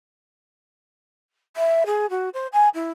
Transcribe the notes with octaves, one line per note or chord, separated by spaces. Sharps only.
E5
G#4
F#4
C5
G#5
E4